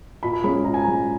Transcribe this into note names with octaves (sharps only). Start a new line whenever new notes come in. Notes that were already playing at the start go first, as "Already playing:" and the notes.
A#2 B5
B5
G#3 C#4 B5
A#2 A#5
G#5
G#3 C#4 A#5